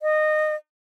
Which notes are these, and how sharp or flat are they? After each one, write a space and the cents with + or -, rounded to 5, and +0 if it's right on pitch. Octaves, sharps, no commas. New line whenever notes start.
D#5 -20